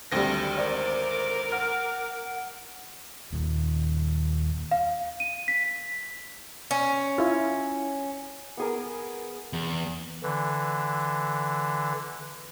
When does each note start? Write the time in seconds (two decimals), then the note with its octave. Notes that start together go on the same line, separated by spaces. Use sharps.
0.12 G#1 D2 G3 C4 A#6
0.58 A#4 C5 D5 D6
1.52 F#5 F6
3.33 D#2 A#2
4.71 F5
5.20 D#7
5.48 B6
6.71 C#4
7.18 E4 F4
8.57 B3 G#4 A#4
9.53 E2
10.23 D3 E3